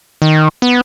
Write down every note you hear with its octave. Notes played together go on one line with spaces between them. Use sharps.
D#3
B3